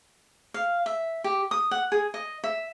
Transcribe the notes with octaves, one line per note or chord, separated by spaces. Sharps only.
F5
E5
G4
D#6
F#5
G#4
D#5
E5